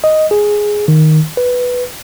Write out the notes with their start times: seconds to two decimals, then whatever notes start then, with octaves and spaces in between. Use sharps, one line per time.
0.04 D#5
0.31 G#4
0.88 D#3
1.37 B4